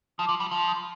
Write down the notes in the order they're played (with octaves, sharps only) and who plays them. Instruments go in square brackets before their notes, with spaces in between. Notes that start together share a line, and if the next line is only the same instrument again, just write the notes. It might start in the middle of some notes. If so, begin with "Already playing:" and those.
[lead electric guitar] F3 [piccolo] D#6
[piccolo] D6
[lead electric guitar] F3
G3
[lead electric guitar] F3 [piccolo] C6
[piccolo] D#6
C6